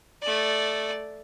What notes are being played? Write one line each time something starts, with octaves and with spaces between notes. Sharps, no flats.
A3 D5